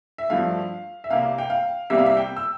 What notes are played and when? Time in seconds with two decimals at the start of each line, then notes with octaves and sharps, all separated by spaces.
0.18 E5
0.30 G2 F3 A3 F5
1.04 E5
1.10 C2 C3 G3 A#3 F5
1.38 G5
1.50 F5
1.90 C2 C3 G3 A#3 E5
1.99 F5
2.06 E5
2.17 G5
2.36 E6